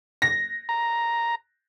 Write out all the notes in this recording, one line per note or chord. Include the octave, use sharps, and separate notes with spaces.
A#6
A#5